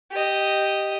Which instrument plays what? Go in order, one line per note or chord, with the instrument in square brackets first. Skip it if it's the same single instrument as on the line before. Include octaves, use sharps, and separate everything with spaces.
[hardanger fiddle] G4 D#5